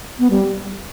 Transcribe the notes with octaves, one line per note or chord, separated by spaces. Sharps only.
B3
G3